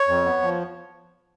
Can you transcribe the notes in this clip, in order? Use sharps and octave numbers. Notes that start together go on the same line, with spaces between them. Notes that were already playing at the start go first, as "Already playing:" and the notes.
Already playing: C#5
F2
B3
F3